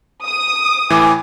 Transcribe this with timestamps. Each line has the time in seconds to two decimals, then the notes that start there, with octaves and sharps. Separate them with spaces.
0.25 D#6
0.90 A2 E3 G#5 D6